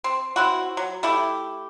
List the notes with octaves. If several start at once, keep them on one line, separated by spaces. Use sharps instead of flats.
C4
C4 E4 F#4
F#3
A3 E4 G4